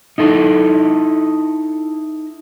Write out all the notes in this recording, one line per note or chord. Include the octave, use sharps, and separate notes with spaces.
D#4 E4 A4